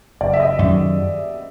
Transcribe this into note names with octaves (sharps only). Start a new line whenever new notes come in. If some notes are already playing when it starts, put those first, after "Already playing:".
F#1 D5
E5
D#5
F#2 D#3 F#3 E5